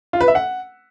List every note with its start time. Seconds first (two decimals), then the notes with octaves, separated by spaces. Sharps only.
0.13 F4
0.21 B4
0.28 E5
0.35 F#5